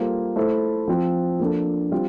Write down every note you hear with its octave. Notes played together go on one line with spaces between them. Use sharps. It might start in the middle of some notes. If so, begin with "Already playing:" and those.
Already playing: G3 A#3 F4 A4 C5
A3 E4 A4 C5
F3 C4 F4
F3 A#3 D4 A4
G3 C4 F4